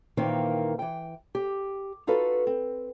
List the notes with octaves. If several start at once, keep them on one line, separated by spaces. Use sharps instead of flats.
A#2 D#3 E3 A#3 C4
E3 G5
G4
D#4 F4 F#4 A4 B4
C4